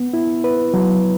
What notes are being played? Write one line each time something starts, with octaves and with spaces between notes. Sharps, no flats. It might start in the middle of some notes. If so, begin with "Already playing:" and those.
Already playing: B3
E4
B4
F#3